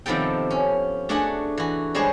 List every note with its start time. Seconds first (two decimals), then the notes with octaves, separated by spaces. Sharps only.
0.06 C3 D#3 F3 B3 A4 G5
0.50 C#4
1.09 A3 D4 F#4 G#4 F#5
1.58 E3 F#4
1.94 G3 G#3 D4 G#4 C5 C#5